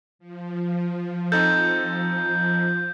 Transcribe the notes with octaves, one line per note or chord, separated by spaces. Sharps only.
F3
C4 D#4 A4 G6